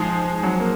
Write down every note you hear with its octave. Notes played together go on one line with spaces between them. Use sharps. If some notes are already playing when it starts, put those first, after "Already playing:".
Already playing: F3 G#3 D#4 G#4 C5
F#3
A#3